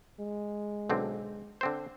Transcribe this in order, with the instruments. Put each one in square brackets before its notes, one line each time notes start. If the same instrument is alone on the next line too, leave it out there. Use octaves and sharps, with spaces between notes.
[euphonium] G#3
[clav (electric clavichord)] B1 D3 C4
D3 C4 C5